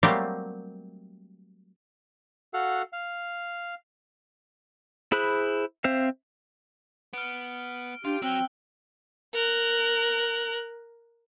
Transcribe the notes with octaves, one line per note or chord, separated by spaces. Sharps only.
F#3 G3 A3 A#3 C4 G4
F#4 A4 F5 F#5
F5
E4 G#4 C5 B5 F#6
C4 C5 E5 F5
B3 F6 D7
D4 F4 G4 D7
F#3 C4 G5 E6 F#6 G7
A#4 F#6